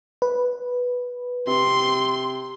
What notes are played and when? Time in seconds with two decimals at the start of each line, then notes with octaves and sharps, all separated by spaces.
0.22 B4
1.47 C3 C6